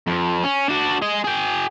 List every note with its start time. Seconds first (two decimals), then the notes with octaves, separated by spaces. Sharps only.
0.08 F2
0.44 C#4
0.69 D4 F#4
1.02 G#4 D#5
1.24 G#4 G5